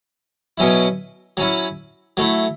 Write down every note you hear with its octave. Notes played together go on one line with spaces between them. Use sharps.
B2 F#3 C#4 E4
F#3 C#4 E4
F#3 A3 E4